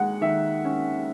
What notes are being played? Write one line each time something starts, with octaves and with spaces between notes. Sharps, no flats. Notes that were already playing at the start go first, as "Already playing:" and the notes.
Already playing: D#2 G#3 F#5
D#3 E5
C#4